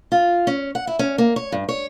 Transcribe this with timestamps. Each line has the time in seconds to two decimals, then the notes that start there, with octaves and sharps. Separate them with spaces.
0.12 F4
0.47 C#4
0.75 F#5
0.87 E4
0.99 C#4
1.18 A#3
1.36 C#5
1.52 G2
1.69 C#5